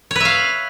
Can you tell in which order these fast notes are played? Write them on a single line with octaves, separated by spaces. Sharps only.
C#5 B4 E5 F5